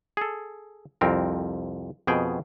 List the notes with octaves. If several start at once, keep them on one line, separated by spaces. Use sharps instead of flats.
G#4 A4
C2 F2 C4 A#4
F2 B2 G#4 G5